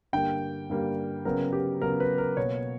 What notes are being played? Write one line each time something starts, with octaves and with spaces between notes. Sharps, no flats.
G2 D3 G3 A#3 G5
G2 D3 G3 A#3
C#3 F#3 B3 A#4
G4
C#3 F#3 B3 A#4
B4
A#4
B2 A#3 C#5